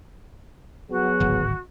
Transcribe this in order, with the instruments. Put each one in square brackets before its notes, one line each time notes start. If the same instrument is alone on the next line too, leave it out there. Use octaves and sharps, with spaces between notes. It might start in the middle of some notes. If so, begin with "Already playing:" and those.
[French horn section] F#3 B3 G#4 [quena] F#4
[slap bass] D1 G#1